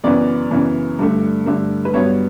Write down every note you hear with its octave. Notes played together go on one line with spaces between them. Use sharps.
F#2 C#3 E3 B3 D5
F#2 C#3 E3 B3
G2 D3 A3
G2 D3 A3
B4
G2 F#3 B3 C#5